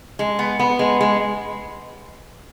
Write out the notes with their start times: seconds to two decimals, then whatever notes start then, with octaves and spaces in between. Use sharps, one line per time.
0.19 G#3
0.39 B3
0.59 B3
0.79 G#3
1.01 G#3